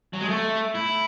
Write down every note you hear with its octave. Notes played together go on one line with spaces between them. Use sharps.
F#3
G#3
A3
E4